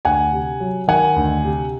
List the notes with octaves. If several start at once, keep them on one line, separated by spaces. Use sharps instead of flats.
D2 F#5 G#5
C3
F#3
D#3 F#5 G#5
D2
C3